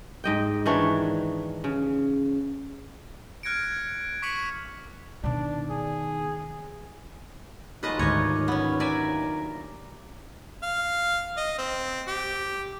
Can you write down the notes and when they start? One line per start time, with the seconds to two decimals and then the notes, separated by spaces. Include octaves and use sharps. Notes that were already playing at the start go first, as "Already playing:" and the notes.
0.24 G#2 D#5 G5
0.66 D#3 E3 D4 C#5
1.64 C#3
3.43 F6 F#6 G#6 A#6 C#7 D7
3.63 G#6
4.22 C#6 D6 B6 C#7 D#7 F#7
5.24 B2 D#3 D4
5.70 G#4
7.83 D#2 F#3 G#3 F4 B4 D#5 A5
7.99 D2 G#2 D#3 A3 D4 C#5 D#5
8.48 B3 C#4
8.80 D5 E5 G#5 A#5
10.63 F5
11.37 D#5
11.58 C4
12.07 G4